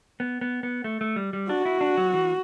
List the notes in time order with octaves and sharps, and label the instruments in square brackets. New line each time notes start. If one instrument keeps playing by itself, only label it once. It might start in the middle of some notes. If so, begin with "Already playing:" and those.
[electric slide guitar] B3
B3
B3
A3
A3
G3
G3
[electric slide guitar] D4 [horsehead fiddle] F#4
[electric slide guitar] E4
D4
F#3
E3